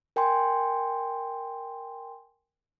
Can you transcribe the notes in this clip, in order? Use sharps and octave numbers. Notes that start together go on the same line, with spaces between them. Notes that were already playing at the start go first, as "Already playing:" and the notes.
A#4 G5 G#5 C6